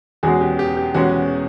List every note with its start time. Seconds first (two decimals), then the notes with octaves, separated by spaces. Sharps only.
0.23 E2 B2 G#3 C#4 F#4 G#4
0.41 G4
0.59 G4
0.77 G4
0.94 E2 B2 G#3 C#4 F#4